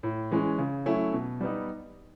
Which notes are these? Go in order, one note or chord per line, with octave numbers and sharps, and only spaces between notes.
A2
E3 G#3 C#4
C#3
F#3 A3 C#4 E4
B2
G3 B3 D#4